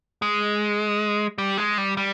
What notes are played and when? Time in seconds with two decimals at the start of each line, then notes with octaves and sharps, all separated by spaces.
0.22 G#3
1.38 G3
1.58 G#3
1.78 G3
1.97 G3